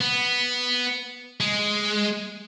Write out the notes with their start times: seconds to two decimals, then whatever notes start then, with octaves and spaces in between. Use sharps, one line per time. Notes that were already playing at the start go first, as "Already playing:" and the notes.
0.01 B3
1.40 G#3